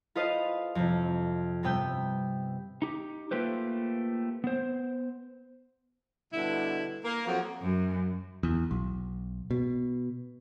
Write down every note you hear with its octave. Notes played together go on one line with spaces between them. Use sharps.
F4 A4 B4 C5 D#5 F5
F2 C3
G2 C3 B3 G5 E6
D#4 G4
A3 A#3 F4 G4 B4 C5
B3 C5
G2 B2 D3 E4
A#3 A#4
F2 F#3
F#2
E2
B1
B2